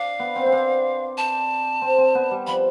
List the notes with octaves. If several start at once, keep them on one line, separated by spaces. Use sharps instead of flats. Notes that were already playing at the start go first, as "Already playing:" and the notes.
Already playing: D4 F5
B3
C4
C4
D4
A5
C4
C4
B3
G3
F3 B5